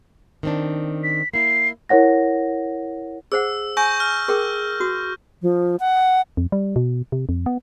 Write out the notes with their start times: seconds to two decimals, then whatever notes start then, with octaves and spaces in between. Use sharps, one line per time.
0.43 D#3 C4 D4
1.04 B6
1.34 A#3 E4 C7
1.89 E4 A#4 C#5 F#5 A#6
3.32 G#4 C5 F#5 E6
3.77 G#5 C#6 G6 A#6
4.00 F6
4.28 G#4 A#4 G5
4.80 F#4 D#6
5.42 F3
5.80 F#5
6.37 F2
6.52 G3
6.76 B2
7.12 C3
7.29 F2
7.46 B3